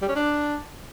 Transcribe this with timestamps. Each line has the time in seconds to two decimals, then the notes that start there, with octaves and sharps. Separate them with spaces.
0.02 G3
0.09 C#4
0.15 D4